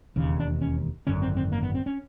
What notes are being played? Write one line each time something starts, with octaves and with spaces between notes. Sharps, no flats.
E1 D#2 C#3
D4
C#4
G#1 F#2 D3 C#4
C4
C4
A#3
B3
C4
C#4